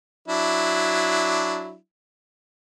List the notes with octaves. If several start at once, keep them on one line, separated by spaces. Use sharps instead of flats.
F#3 D4 E4